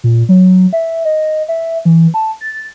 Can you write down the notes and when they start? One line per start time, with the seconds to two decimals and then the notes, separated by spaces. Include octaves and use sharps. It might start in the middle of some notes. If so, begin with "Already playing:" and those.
0.04 A#2
0.29 F#3
0.73 E5
1.05 D#5
1.48 E5
1.85 E3
2.14 A5
2.41 A6